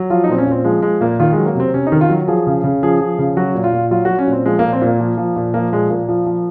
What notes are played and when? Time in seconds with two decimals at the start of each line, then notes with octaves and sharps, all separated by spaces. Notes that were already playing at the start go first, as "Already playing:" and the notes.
Already playing: F#3
0.10 F3 F4
0.24 D#4
0.29 A#2 C4
0.38 C#4
0.47 A#2 C4
0.64 F3 G#3
0.82 F3 G#3
1.01 A#2 A#3
1.20 D#3 F4
1.33 G#3
1.38 F#3
1.46 A#3
1.55 C3 C4
1.74 C3 C#4
1.87 D#4
1.92 D#3
2.01 F4
2.10 F#3
2.28 F3 G#4
2.47 C#3
2.64 C#3
2.83 F3 G#4
3.01 F3
3.19 C#3
3.37 F#3 F#4
3.55 A#2
3.64 F4
3.73 A#2
3.91 F#3 F4
4.05 F#3 F#4
4.19 C#4
4.27 A#2
4.32 C4
4.46 F3 G#3
4.59 A#3
4.64 A#2
4.73 C4
4.81 A#2 A#3
5.00 F3
5.17 F3
5.36 A#2
5.54 F3 A#3
5.72 A#2 G#3
5.90 A#2 A#3
6.09 F3
6.26 F3